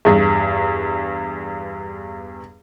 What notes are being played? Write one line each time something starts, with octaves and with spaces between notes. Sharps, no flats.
E2 G2